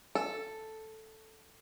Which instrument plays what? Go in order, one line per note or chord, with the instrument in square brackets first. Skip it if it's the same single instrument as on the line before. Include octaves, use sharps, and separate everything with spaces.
[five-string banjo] A4